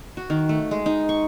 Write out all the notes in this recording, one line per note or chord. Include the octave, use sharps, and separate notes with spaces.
F#4
D#3
A3
G#3
D#4
C#6